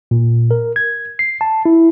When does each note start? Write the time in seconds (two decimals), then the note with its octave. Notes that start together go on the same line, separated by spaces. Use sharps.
0.11 A#2
0.51 A#4
0.76 G#6
1.19 C7
1.41 A5
1.66 E4